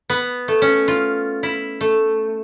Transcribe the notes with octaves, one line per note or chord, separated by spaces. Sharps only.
B3
A3
C#4
F4
E4
A3